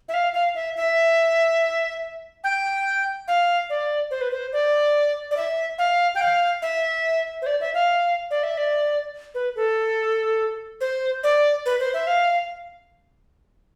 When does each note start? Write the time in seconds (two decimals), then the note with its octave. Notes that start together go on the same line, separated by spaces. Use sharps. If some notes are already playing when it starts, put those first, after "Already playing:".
0.09 E5
0.14 F5
0.33 F5
0.55 E5
0.76 E5
2.44 G5
3.28 F5
3.70 D5
4.11 C5
4.21 B4
4.31 C5
4.53 D5
5.31 D5
5.37 E5
5.78 F5
6.15 G5
6.21 F5
6.62 E5
7.42 C5
7.46 D5
7.61 E5
7.74 F5
8.31 D5
8.43 E5
8.58 D5
9.35 B4
9.56 A4
10.81 C5
11.23 D5
11.66 B4
11.80 C5
11.94 E5
12.07 F5